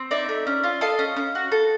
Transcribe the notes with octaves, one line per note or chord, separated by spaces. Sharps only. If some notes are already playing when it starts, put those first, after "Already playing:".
Already playing: C4
D#4 D5 E5
A3
C#4
F4
A4 D#5 F5
C#4
C#4
F#4
A4